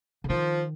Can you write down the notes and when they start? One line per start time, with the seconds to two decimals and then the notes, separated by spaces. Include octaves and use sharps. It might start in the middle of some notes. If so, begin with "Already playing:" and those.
0.24 D3
0.30 D#3 F3